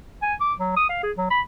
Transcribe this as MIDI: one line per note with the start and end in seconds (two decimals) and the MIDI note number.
0.22 0.34 80
0.41 0.53 86
0.59 0.71 54
0.76 0.87 87
0.89 1.01 77
1.03 1.12 68
1.17 1.25 54
1.30 1.40 83